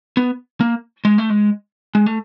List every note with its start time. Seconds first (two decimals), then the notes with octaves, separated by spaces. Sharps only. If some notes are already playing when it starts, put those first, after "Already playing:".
0.17 B3
0.60 A#3
1.05 G#3
1.18 A3
1.30 G#3
1.95 G#3
2.06 A3